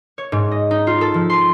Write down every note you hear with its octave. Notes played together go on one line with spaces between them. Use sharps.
C#5
G#2
D#5
D#4
F4
A4
F3
C6